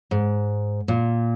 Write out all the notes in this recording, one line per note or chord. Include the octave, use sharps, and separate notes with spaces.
G#2
A#2